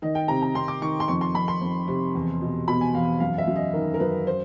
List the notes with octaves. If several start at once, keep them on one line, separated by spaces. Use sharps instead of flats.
D#3 D#5
G5
C3 A#5
A#5
C3 C6
D6
D#3 C#6
C6
F2 C#6
C6
F2 B5
C6
F2
C3
E2
B2
B2 B5
G#5
E2 F5
F#2 F5
E5
F#2
D#5
D#3 A#4
A#4
F#2 B4
C5